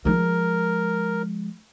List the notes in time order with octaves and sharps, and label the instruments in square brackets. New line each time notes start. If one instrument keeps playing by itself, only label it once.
[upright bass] F3 G#3 [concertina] A#4